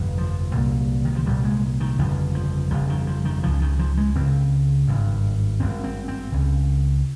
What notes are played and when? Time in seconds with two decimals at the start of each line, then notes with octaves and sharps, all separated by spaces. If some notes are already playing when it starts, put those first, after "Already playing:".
Already playing: G1 F2 C3
0.18 F3
0.55 C2 A#2
1.05 D#3
1.16 F3
1.26 C2 A#2 G3
1.44 G#3
1.80 D#3
1.99 G1 F2 C#3 F3
2.35 F3
2.71 G1 F2 C#3 F3
2.90 D#3
3.07 F3
3.25 D#3
3.43 C#2 C#3 F3
3.61 D#3
3.79 F3
3.97 G#3
4.15 C#2 C#3 C4
4.88 G#1 G2
5.60 G#1 G2 C4
5.84 C4
6.08 C4
6.32 C#2 C#3